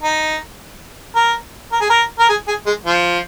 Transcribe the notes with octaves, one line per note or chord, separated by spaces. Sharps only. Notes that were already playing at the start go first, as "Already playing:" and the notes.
D#4
A#4
A#4
G#4
A#4
A#4
G#4
G#4
G#3
F3